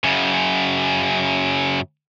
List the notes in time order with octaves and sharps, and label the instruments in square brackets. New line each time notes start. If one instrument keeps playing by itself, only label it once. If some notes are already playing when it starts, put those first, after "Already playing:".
[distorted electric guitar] F#2 C#3